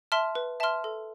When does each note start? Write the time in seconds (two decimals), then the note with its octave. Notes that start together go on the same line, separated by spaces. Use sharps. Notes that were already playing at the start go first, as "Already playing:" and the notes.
0.12 E5 A5 C6 F6
0.35 B4
0.60 E5 A5 C6 F6
0.84 A4